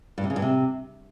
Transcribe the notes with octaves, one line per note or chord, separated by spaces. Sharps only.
G2
C3
C#3
G2
C3